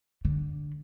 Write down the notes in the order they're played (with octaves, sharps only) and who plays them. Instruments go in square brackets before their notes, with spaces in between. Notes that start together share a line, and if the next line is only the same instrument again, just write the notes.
[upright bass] D3